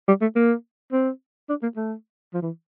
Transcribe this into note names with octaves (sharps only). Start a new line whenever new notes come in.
G3
A3
A#3
C4
D4
A#3
A3
F3
E3